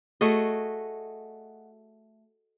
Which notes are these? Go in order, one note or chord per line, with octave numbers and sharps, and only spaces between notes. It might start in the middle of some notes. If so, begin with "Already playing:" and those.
A3 F#4 G#4 D#5